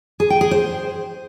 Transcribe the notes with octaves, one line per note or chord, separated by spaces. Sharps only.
G#4
G5
G#4
C5